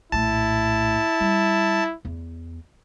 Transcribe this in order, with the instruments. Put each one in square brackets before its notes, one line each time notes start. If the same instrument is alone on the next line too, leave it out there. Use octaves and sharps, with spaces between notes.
[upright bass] A#1 A2 [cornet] E4 [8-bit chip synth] A5
[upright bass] G3
E2